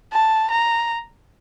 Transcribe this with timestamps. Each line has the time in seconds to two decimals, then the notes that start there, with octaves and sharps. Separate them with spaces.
0.13 A5
0.51 A#5